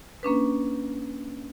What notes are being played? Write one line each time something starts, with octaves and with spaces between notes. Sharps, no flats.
A#3 C#4 D4 B4